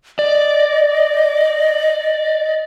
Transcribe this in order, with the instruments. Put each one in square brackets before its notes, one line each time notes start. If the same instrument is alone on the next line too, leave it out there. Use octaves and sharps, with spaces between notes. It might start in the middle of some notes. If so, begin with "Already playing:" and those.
[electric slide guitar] D5 [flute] D#5